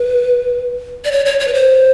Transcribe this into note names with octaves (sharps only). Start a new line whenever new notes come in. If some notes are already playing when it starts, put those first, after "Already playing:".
Already playing: B4
D5
C#5
C#5
C#5
B4
C5